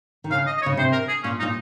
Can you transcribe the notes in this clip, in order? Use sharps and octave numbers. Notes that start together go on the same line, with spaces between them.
D#3
C#3 F5
D#5
D#5
C#5
C#3
C3 C5
A#4
G#4
A#2 C#4
D#4
A#2